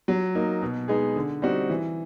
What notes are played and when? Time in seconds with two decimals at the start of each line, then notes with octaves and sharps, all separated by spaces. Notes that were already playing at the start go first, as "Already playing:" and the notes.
0.08 F#3
0.35 A#3 D#4
0.62 B2
0.88 G#3 B3 D#4 G#4
1.16 D3
1.42 G3 C4 D#4 F#4
1.70 E3